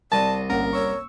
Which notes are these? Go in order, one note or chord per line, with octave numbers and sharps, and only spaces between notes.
C2 D5 A5 A6 A#6 D#7
G1 A#3 C#4 A#4 F#5
C#5 C#6 E6